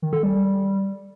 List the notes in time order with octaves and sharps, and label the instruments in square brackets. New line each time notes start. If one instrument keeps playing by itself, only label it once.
[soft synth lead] D#3
A4
G3